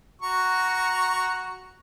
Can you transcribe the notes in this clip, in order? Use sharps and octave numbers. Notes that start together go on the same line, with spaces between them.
F#4 A#5 C#6